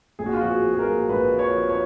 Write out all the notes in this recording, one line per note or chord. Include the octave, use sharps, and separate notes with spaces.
A#1 G#4
F#4
F4
F3 F#4
G#4
F3
G#4
A#4
A#2
A#1 B4
F3
C#5
F3
C#5